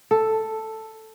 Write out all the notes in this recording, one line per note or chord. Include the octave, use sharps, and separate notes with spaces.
A4